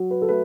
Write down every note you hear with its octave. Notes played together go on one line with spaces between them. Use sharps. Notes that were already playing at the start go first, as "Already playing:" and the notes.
Already playing: F#3
B4
A4
A3 B4